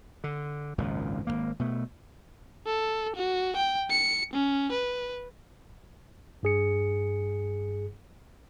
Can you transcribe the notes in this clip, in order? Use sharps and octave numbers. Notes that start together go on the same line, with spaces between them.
D3
G#1 C#2 F#2 A#2
G#1 E2 A#3
B2 A3
A4
F#4
G5
C#7
C#4
B4
G2 G#4 C#7